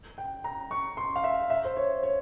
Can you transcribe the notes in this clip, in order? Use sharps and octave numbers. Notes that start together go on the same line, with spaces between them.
G5
A#5
C#6
C6
F5
E5
E5
C5
C#5
C#5